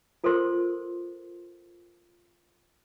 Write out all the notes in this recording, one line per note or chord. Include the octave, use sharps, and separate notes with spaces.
F4 A4 A#4 C5 C6